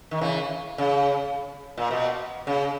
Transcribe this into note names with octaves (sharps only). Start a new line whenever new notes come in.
D#3
C#3 E3
C#3
A#2
B2
C#3